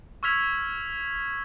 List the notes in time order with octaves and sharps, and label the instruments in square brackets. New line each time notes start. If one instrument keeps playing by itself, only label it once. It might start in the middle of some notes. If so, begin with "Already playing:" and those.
[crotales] C#6 E6 F6 G#6 B6 F7